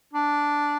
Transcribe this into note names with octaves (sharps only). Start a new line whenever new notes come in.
D4